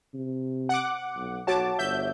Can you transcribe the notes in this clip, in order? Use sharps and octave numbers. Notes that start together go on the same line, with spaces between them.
C3
F#5 D6
B1
B1 F#4 C#5 F#5 A5 D6
G1 E5 G6